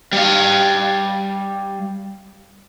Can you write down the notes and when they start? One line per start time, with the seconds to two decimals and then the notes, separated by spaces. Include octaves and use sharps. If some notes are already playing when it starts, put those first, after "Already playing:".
0.13 G3 F5